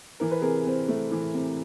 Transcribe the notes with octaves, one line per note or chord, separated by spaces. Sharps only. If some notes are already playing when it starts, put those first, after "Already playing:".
E3 A#4
B4
C3 G#4 A#4
C4
A3
E3
C3